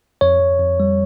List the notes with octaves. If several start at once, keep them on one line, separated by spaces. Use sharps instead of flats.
F2 C#5
F2
F2
G3